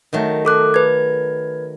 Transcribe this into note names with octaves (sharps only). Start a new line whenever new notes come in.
D#3 F#3 A3
A4 D6 F#6
B4 G#6